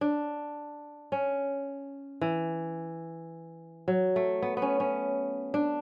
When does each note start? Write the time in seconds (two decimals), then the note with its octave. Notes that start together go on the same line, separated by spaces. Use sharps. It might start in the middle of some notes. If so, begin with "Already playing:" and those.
0.01 D4
1.12 C#4
2.21 E3
3.88 F#3
4.16 A3
4.42 B3
4.57 B3
4.62 C#4
4.80 C#4
5.54 D4